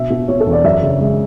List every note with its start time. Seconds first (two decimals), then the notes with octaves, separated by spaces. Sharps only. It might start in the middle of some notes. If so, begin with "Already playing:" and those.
Already playing: B2 E5
0.10 B2
0.28 B2 C#5
0.40 A4
0.47 E2
0.52 D5
0.64 F#2 E5
0.83 C#3
1.01 G#3